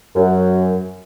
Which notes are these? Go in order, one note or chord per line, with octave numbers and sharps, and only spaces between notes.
F#2